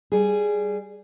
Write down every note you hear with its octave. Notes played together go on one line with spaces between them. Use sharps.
G3 G#4